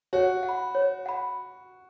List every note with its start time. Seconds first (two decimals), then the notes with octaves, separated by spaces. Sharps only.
0.13 F#4 C#5
0.43 F#5
0.49 B5
0.75 C#5
1.06 F#5 B5